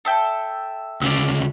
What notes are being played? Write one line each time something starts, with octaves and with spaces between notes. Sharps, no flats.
A4 E5 G5
D2 C#3 D5 E6